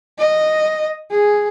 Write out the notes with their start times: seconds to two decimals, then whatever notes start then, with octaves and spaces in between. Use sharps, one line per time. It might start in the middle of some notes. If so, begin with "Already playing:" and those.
0.18 D#5
1.11 G#4